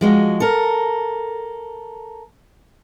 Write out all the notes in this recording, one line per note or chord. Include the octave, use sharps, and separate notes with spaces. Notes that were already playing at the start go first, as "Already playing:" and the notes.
F3 G#3 F#4
A4 A#4